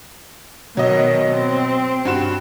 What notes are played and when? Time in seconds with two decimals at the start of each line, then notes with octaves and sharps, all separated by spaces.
0.77 B2 D#3 F#3 D#5
1.32 C4
2.05 G2 F#4 E7